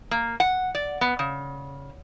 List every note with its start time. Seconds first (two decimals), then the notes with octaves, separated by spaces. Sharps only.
0.11 A#3
0.40 F#5
0.75 D5
1.01 B3
1.19 C#3